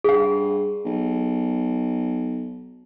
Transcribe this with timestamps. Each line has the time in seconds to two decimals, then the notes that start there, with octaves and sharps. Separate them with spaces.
0.04 G2 G#4 F#5
0.85 B1